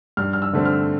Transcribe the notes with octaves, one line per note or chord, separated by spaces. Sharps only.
G2 F6
F6
E6
D3 A3 C4
F6